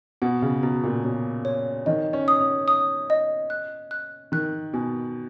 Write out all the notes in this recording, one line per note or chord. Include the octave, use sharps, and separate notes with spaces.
B2 F#5
C#3
B2 A#5
A#2
B2 C#5
C#5
D#3 D#5
C#4
D#6
C#4
D#6
D#5
F#6
F#6
D#3 F#6
B2 G#5